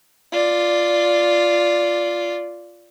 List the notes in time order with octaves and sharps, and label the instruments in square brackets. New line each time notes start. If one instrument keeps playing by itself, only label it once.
[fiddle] F4 D5